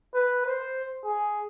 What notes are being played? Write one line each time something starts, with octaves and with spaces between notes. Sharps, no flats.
B4
C5
G#4